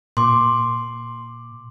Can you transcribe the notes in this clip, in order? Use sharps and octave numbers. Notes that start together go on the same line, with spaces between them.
A#2 C6 D6